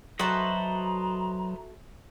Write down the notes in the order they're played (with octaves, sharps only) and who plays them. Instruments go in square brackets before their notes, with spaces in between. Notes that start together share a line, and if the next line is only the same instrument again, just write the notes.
[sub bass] F#3 [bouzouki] F#4 A4 E5 [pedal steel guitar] B4 C5 D#5 [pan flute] A#5